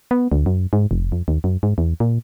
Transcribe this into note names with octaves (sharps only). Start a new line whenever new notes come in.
B3
D2
F#2
G#2
F1
F2
D#2
F#2
G#2
E2
A#2